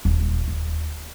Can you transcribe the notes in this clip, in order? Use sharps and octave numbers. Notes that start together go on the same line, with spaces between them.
D#1
D#2